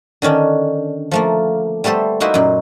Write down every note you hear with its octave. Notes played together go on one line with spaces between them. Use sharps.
D3 D#3 C#4 D4
F3 A3 A#3
G3 A3 B3 A4 C5
A#3 D#4 E4 F#4 C5 E5
F#2 A#2